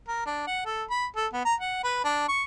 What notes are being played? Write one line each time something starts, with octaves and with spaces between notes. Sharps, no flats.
A#4
D4
F#5
A4
B5
A4
B3
A#5
F#5
B4
D4
C#6